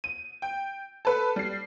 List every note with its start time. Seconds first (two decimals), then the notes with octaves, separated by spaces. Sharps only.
0.04 D#7
0.42 G5
1.05 A4 B4
1.36 G3 C7